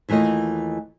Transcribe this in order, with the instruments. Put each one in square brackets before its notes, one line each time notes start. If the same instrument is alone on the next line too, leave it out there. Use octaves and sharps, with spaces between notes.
[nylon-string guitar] D#2 E3 A3 F4 D#5